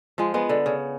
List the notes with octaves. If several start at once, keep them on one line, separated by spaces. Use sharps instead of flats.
F3 G#3
G#3 B3
D3
C#3